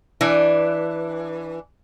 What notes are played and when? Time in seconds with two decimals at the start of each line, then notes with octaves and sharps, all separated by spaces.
0.21 E3 D4